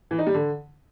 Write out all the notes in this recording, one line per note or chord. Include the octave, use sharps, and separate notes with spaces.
E3
D#4
G3
D3